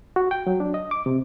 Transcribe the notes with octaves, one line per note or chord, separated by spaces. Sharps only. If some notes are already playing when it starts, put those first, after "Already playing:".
F#4
G5
F#3
D4
D#5
D6
C3